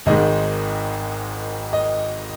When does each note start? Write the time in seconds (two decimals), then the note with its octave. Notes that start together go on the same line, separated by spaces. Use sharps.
0.06 G#1 G#2 D#3 G#3 D#5
1.73 D#5